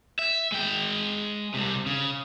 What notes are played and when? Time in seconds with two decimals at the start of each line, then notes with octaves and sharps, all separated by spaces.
0.19 E5
0.52 G#3 G5
1.54 C2 C3
1.86 C#3